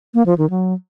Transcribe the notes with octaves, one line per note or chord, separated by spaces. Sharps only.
A#3
F3
D#3
F#3